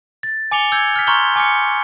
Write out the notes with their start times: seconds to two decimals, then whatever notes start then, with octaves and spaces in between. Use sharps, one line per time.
0.23 A6
0.51 G#5 D6 C#7 F7 G7
0.72 E6 G6 G#6 C#7
0.96 F6 B6
1.07 A#5 C6 C#6 F6 G6 G7
1.36 G#5 D6 F6 C#7